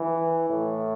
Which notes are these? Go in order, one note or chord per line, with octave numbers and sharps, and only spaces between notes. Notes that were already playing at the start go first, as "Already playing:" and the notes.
Already playing: E3
A2